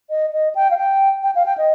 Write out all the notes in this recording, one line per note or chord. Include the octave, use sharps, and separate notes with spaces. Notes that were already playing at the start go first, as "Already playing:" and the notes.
D#5
D#5
G5
F5
G5
G5
F5
G5
D#5